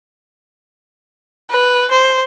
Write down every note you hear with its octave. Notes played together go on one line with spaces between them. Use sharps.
B4
C5